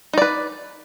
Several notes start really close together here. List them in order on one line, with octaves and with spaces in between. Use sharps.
D#4 D5 B4